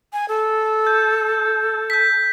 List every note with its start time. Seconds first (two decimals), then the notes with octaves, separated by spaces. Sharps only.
0.13 G#5
0.29 A4
0.87 G6
1.90 G6 B6